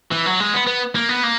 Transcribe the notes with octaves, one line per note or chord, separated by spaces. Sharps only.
E3
F#3
G#3
B3
B3
A#3
B3
A#3